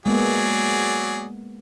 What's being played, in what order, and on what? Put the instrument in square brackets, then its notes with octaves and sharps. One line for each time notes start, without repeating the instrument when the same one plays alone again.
[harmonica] F#3 G#4 D5 [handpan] G#3 A#3 B3